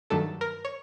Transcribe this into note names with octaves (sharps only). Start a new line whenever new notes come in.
G2 D#3 F#3 A3 D4 A4
A#4
C#5